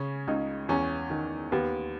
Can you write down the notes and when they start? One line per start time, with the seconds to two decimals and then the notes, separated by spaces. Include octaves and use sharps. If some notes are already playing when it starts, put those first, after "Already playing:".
Already playing: C#3 C#4
0.27 C#2 D#4
0.69 E2 C#4
1.10 D#3
1.52 D#2 B3